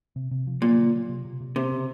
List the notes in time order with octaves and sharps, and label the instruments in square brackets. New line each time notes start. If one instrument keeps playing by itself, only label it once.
[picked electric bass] C3
C3
F3
[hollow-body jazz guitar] A#2 [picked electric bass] F#3
[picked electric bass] C#3
F#3
C3
C3
C3
[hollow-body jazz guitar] C3 [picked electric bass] C4
[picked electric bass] C#3